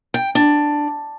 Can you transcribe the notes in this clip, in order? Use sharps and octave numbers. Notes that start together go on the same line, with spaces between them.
G5
D4